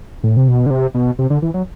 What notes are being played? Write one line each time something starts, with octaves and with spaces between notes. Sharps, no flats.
A2
C3
B2
D3
C3
B2
C3
D3
E3
F#3